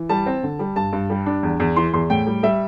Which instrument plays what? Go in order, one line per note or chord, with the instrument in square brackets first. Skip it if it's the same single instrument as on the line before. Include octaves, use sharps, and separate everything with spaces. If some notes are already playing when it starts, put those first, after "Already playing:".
Already playing: [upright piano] E3
G3 A5
C4
D3
G3
G2 A5
G2
G3
D4
E2
E2
E3 C6
E2 C6
A2 G5
G3
G3 E5